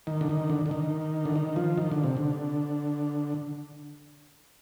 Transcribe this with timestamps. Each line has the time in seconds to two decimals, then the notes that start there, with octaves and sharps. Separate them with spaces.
0.07 D#3
0.21 D3
0.29 D#3
0.50 D3
0.66 D3
0.71 D#3
1.25 D3
1.36 D#3
1.56 F3
1.78 D#3
1.91 D3
2.04 C3
2.17 D3